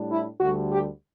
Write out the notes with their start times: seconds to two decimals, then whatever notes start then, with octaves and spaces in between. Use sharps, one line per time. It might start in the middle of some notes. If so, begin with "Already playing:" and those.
Already playing: A2 G3 D4
0.11 E4
0.40 D2 D3 G3 F#4
0.70 G4